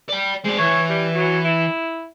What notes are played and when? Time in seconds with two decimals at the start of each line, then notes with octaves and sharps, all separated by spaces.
0.09 D5 G5
0.44 G#3 C4 D5
0.58 E3 C#5
0.89 G3
1.14 F#3
1.45 E4